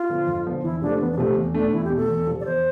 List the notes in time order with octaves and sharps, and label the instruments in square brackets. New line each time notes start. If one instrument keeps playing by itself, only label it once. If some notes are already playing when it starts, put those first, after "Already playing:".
Already playing: [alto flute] F4
[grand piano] D3 F3 B3
F2
D3 F3 B3
[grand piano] E2 [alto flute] E4
[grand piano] C3 F3 A3 [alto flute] D4
[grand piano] E2 [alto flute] B3
[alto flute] D4
[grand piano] C3 F3 A3 [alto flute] C4
[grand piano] E2
[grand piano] B2 A3 [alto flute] D4
[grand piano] E2 [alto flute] E4
[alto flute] G4
[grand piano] B2
[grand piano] A3 [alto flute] A4
[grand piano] E2
C3 F3
[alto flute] D5
[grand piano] E2 [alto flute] C5